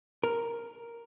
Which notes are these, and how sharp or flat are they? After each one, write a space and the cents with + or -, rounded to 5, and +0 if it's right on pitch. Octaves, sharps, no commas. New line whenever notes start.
A#4 +0